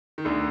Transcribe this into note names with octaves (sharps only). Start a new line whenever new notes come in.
D#3
D2 D3